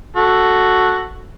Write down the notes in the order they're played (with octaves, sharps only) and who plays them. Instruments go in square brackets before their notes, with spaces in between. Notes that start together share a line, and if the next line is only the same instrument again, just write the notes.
[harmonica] F#4 A4